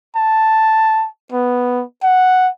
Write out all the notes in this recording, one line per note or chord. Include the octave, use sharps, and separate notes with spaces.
A5
B3
F#5